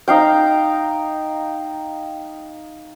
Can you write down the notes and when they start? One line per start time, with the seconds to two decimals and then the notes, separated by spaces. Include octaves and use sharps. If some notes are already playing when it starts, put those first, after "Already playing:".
0.08 D#4 F5 G5